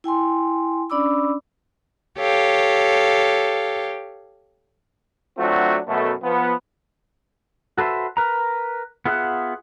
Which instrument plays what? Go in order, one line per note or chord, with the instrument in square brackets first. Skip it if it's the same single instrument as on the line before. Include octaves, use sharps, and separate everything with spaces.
[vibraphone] E4 G5 G#5 C6
C#4 D4 D5 B5 D6 E6
[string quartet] G4 A4 C#5 F5
[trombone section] F#3 A3 C4 D4 F4 F#4
F#2 B2 A3
F3 B3
[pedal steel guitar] F#4 A4 B4 C5 E5
A#4 B4 A#5
B3 F4 G#4 E5 F#5